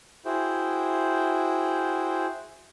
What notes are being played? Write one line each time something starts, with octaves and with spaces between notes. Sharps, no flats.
E4 F#4 G#4 C5 G5